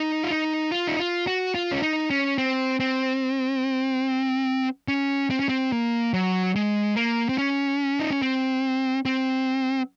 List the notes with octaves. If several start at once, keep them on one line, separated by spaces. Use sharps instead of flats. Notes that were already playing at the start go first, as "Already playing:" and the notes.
Already playing: D#4
F4
D#4
F4
D#4
F4
F#4
F4
C#4
D#4
C#4
C4
C4
C#4
C4
C#4
C4
A#3
F#3
G#3
A#3
C4
C#4
D#4
C#4
C4
C4